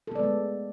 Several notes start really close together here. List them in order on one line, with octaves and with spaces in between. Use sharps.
A4 B3 D5 G#3 A3